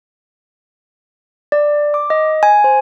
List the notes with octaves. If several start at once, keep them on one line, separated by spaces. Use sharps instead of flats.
D5
D6
D#5
G#5
C5